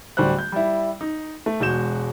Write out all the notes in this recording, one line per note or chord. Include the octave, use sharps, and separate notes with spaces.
D1 D3 G3 F#4 C5 F#6
G6
G3 E4
D#4
A3
E1 G#3 F#4 G6 E7